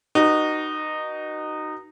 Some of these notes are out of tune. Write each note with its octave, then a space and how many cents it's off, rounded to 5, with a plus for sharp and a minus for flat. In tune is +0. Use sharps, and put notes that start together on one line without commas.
D#4 -15 F#4 +25 B4 -40